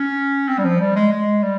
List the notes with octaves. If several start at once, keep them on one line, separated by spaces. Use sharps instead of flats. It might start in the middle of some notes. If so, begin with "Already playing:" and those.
Already playing: C#4
C4
G3
F3
G3
G#3
G#3
G3